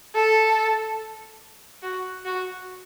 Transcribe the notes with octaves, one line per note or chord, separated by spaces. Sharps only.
A4
F#4
F#4